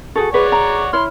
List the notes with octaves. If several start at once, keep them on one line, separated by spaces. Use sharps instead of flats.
F#4 G#4 A4 C#6
G#4 B4 C#5 D5 F#5
A#5
E4 C#5 B5 C6 F6